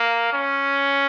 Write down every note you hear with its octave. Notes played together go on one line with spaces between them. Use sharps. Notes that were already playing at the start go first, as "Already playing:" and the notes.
Already playing: A#3
C#4